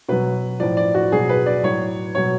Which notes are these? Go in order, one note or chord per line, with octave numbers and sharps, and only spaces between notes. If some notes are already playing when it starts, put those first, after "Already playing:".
B2 F#3 B4
A2 F3 D5
D5
F#4
B2 F#3 G#4
B4
D5
A2 F#3 C#5
B2 F#3 C#5